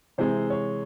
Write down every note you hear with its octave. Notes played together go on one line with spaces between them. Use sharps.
C3 E3 G#3 C5
C#5